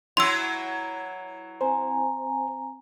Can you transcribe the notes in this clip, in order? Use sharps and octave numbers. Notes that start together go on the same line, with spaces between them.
E3 F#3 E4 C6 E6
C4 C5 G#5 A#5